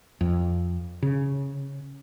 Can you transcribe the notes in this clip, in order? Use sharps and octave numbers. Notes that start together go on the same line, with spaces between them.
F2
C#3